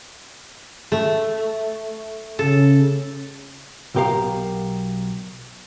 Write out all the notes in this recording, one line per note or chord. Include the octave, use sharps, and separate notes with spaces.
A3
C#3 A4
B1 B2 G4 A#4 F5